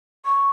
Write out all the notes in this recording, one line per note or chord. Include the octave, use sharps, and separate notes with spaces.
C#6